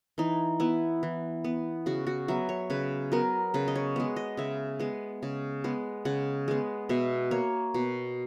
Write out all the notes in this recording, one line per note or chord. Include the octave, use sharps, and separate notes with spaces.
E3 D#4
B3 E4
E3
B3
C#3 F#4
F#4
F#3 B3 E5
C#5
C#3 B4
F#3 B3 A#4
C#3 B4
D#5
C#5
G#3 B3
D#5
C#3 E5
G#3 B3
C#3
G#3 B3
C#3 F#5
G#3 B3
B2 E5
A#3 C#5
B2